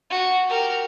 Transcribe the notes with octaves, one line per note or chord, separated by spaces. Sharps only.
F#4
G4 A#4